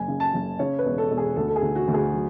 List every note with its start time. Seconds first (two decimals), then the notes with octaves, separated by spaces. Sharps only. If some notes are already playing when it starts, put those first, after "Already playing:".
Already playing: F#1 G#5
0.08 C#3
0.20 A5
0.34 F#1
0.59 C#3 C#5
0.79 B4
0.85 E1
0.98 A4
1.10 E1
1.17 G#4
1.36 D2 A4
1.48 A4
1.56 G#4
1.62 D2
1.75 F#4
1.88 D2
1.94 G#4
2.14 F#3